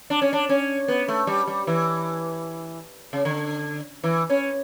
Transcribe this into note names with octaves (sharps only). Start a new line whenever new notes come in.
D4
C#4
D4
C#4
B3
A3
G3
G3
E3
C#3
D3
E3
C#4